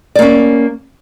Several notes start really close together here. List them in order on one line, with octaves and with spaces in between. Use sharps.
D5 A#3 C#4